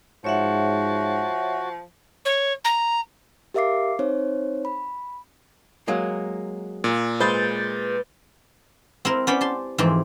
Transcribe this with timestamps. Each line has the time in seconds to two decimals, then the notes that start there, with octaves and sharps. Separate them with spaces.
0.24 G#2 F3 F#4 C#5 E5 F#5
2.25 C#5
2.65 A#5
3.54 G4 A#4 E5 F5 D6 C7
3.99 C4 D#4 C5 C#5
4.65 B5
5.88 F#3 G#3 A#3
6.84 A#2
7.20 G#3 B4 C5 G6 A6
9.05 C4 E4 A#4
9.27 B3 C#4 C5 D5 G5 B5
9.41 G4 A5 C6
9.78 F2 G#2 E3 C4 G4